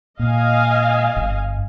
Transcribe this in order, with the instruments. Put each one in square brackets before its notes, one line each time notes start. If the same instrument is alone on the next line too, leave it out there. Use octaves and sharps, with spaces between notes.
[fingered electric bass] A#2 [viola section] D#5 F5 G#5
[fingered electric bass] G1